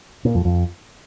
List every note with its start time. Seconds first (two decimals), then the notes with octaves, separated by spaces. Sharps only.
0.25 A#2
0.35 F2
0.45 F2